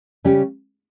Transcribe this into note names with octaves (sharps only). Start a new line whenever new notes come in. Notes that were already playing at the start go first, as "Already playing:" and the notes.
C#3 G3 C#4 G4